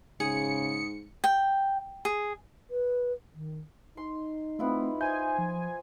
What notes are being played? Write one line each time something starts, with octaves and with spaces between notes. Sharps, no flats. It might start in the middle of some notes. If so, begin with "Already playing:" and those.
G#2 C#3 G#4 C#7
G5
G#4
B4
D#3
D#4 C6
A3 B3 C4 E4 F4
C5 D#5 E5 G#5 G6
F3